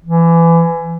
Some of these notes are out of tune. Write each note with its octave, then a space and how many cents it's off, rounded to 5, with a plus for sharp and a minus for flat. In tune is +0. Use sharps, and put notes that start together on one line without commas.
E3 +25